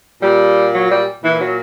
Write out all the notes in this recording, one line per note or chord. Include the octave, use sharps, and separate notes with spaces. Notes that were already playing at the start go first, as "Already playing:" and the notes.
A#2 G3
F#3
G3
A#2 E3
F#3